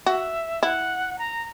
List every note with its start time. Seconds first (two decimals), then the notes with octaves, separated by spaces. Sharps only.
0.06 F#4 E5
0.63 E4 F#5
1.19 A#5